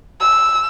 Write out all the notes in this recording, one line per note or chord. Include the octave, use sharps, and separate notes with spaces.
E6